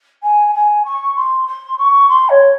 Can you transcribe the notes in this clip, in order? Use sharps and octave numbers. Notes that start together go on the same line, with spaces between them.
G#5
G#5
C#6
C6
C6
C#6
C6
C#5